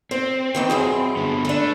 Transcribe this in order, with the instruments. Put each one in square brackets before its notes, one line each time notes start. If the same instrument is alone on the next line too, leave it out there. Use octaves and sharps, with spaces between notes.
[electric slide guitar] C4 [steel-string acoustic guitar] C5
[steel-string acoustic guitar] D#3 E3 G5
F#2 E4 G#4
[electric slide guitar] D3 B3
[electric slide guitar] A3 [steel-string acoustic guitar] D4 B4